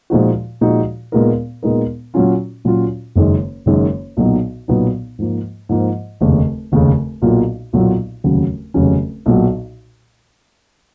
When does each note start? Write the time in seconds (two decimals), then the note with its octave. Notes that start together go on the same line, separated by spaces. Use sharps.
0.10 A#2 F3 G#3 D#4 F#4
0.61 A#2 F3 G#3 D#4 F#4
1.12 A#2 G#3 B3 D#4 A#4
1.63 A#2 G#3 B3 D#4 A#4
2.14 A#2 F#3 C#4 F4
2.65 A#2 F#3 C#4 F4
3.16 F#1 F#2 D#3 G#3
3.66 F#1 F#2 D#3 G#3
4.17 B1 A#2 F#3 B3 D#4
4.68 B1 A#2 F#3 B3 D#4
5.19 G#2 F3 A#3
5.69 G#2 F3 A#3
6.21 F1 D#2 C#3
6.72 F1 D#2 C#3
7.22 B1 A#2 F#3 A#3 F4
7.73 B1 A#2 F#3 A#3 F4
8.24 F1 D#2 C#3 F#3 C#4
8.74 F1 D#2 C#3 F#3 C#4
9.26 B1 A#2 F#3